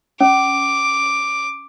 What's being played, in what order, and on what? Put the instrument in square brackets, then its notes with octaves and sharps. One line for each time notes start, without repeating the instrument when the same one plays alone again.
[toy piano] C#4 [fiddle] D6